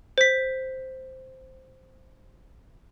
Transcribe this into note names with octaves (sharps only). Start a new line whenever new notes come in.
C5 B6